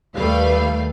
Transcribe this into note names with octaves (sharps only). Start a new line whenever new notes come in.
D#2 G3 A3 B4 F5